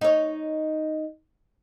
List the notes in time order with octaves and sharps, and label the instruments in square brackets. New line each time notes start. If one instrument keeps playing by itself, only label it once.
[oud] D#4 C#5